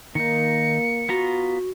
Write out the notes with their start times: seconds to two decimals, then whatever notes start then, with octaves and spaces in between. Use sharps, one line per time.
0.15 D#3 A#3 D#4 C#7
1.09 B3 F4 F#4 A#5